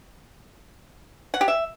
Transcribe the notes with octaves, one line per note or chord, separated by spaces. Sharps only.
F#5
G4
E5